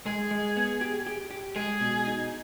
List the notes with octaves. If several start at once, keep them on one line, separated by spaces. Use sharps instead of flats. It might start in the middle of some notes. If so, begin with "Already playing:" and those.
G#3 G#4
G#3
B3
G4
G4
G4
G#3 G#4
B2
D#4